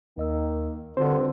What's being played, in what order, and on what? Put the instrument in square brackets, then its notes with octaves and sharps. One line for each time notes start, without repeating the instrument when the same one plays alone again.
[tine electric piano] D#2 D#5 E6 [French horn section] D#3 A#3
[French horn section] G2 [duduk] D3 [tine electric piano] C4 F4 F#4 [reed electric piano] C5